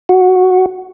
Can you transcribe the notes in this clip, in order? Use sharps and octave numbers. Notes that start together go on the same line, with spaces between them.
F#4